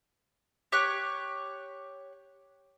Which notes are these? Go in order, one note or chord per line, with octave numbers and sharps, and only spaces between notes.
G4 C#5 C#6 F#6